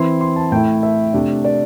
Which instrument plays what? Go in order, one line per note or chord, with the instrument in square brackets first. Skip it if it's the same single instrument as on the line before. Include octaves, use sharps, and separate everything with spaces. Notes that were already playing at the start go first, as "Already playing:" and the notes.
Already playing: [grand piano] E3 C4 E4 C6
C6
A5
A2 A3 E4 G5
E5
C3 A3 D4
D5